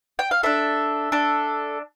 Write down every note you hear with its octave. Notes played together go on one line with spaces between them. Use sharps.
G5
F5
D4 A4 E5
D4 A4